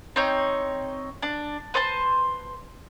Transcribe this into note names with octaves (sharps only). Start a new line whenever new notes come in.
C4 D#4 C#5 G6
D4
B4 C5 A5 C6